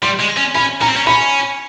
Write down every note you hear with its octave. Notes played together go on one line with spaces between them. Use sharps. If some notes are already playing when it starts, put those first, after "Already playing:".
G3 C6
G#3
C#4
C#4 B5
C#4 A#5
C4
C#4
C#4 B5